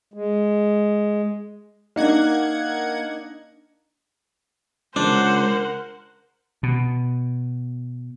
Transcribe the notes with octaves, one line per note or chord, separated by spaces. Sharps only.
G#3
A#3 D4 D#4 F#5 G#6
C#2 D4 A#4 C5 F#5
B2